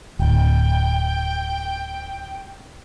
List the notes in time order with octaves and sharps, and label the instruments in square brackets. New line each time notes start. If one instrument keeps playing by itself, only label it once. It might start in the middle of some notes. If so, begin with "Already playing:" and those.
[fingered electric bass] D1 [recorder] G5